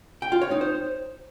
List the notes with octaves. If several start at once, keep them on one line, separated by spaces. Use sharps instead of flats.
G5
F4
C#5
D#4
C5